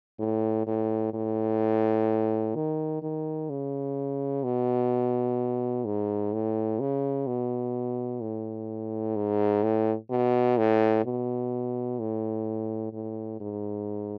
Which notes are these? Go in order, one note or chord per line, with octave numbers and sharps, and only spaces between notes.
A2
A2
A2
D#3
D#3
C#3
B2
G#2
A2
C#3
B2
A2
G#2
A2
B2
A2
B2
A2
A2
G#2